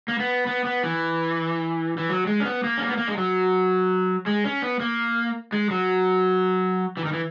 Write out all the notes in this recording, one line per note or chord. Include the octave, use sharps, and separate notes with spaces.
A#3
B3
B3
B3
E3
E3
F#3
G#3
C#4
B3
A#3
C#4
B3
A#3
G#3
F#3
G#3
C#4
B3
A#3
G#3
F#3
E3
D#3
E3